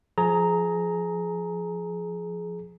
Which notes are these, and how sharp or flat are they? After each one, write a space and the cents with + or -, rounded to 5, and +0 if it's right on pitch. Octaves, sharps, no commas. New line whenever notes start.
F3 +0 G#4 +25 A#5 -5